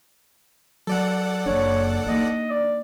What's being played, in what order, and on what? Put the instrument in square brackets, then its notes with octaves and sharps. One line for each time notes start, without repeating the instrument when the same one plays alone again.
[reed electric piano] F#3 [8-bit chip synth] A4 D5 F#5
[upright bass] F#1 [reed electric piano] D4 [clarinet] C#5
[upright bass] A#3 D#4 [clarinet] D#5
[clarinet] D5